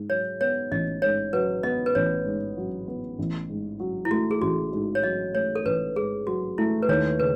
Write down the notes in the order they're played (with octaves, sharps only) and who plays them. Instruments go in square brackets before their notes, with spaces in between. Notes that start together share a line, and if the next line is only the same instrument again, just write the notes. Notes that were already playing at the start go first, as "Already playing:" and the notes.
Already playing: [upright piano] G#2
[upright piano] F#3 [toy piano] C#5
[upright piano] B3 [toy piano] C#5
[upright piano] A1 [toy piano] D#5
[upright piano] G#2 [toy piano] C#5
[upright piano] F#3 [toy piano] B4
[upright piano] B3 [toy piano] D#5
[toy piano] B4
[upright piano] A1 [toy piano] C#5
[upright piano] G#2
F#3
B3
A1
G#2
F#3
[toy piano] E4
[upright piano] A3 [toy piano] F#4
[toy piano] G#4
[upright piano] A1 [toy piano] F#4
[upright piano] G#2
[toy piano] C#5
[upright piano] F#3 [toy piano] D#5
[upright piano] A3 [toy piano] C#5
[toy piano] A4
[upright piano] A1 [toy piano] B4
[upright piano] G#2 [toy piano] G#4
[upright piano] F#3 [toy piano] F#4
[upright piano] A3 [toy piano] E4
[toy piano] B4
[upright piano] D#2 [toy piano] C#5
[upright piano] C#3 [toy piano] B4